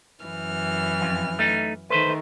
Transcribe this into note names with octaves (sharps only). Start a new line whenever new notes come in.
F#2 E3 F6
F2
A3 D#4
D#3 A3 B4 C5